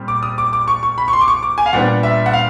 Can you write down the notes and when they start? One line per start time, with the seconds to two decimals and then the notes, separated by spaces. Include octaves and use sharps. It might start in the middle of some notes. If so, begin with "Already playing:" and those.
Already playing: A#2 G3 C4
0.08 D6
0.23 D#6
0.38 D6
0.53 D6
0.68 C#6
0.83 C#6
0.98 B5
1.08 C#6
1.13 C6
1.21 D6
1.28 C#6
1.43 D6
1.58 G#5
1.66 F5
1.73 A#2 G3 B3 D4 F#5
2.03 E5
2.26 F#5
2.33 F5